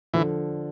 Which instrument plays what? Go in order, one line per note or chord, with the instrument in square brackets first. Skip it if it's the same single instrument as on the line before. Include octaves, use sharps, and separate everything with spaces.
[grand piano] D3 F3 [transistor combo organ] E3